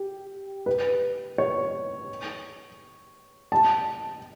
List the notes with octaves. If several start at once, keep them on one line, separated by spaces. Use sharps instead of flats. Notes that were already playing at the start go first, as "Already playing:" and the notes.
Already playing: G4
B4
C#5
A5